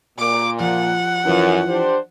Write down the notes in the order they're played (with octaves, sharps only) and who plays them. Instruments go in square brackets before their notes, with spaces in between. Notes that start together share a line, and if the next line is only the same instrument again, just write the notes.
[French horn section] A#2 [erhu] D6
[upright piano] F3 [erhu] F#5
[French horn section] F#2 [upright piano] E3 F3
[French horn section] D4 G4 C5